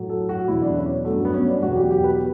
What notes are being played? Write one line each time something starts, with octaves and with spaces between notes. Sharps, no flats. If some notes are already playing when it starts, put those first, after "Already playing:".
Already playing: A2 F#3
A4
F#4
E2 B2 F#3 E4
D4
C#4
G2 F#3 A3
B3
C#4
D4
E2 B2 F#3 F#4
G4
G4
B4